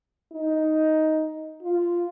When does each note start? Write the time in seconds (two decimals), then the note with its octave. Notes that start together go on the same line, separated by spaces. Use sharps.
0.32 D#4
1.62 F4